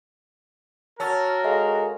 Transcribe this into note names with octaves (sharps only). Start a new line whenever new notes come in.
C#4 F#4 A#4 A5 E6 A6
G#3 A4 F5 A#6